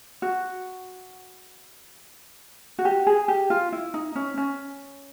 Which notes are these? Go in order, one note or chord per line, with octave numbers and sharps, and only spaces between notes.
F#4
F#4
G4
G#4
G4
F4
E4
D#4
C#4
C#4